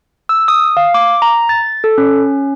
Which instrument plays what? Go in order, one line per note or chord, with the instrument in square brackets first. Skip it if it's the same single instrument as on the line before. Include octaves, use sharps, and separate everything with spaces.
[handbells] E6
D#6
F5
D6
A#5
A6
A4
C#4